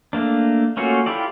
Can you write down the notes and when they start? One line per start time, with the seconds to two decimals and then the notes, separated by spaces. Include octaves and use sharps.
0.13 A3 A#3 D4
0.77 A3 A#3 C#4 F4 F#4
1.06 E4 F4 G4 A4 D5